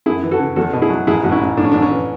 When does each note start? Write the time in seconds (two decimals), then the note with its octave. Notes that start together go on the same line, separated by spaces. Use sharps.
0.06 F#2 E4 G#4
0.23 E3
0.31 F#4 A4
0.39 C#3
0.56 E2 F#4 A4
0.73 B2
0.82 E4 G#4
0.90 F#3
1.07 A1 E4 G#4
1.24 A1 F#4
1.32 C#4 E4
1.41 A1
1.57 A2 D4
1.64 C#4
1.72 A1 D4
1.82 C#4
1.91 E3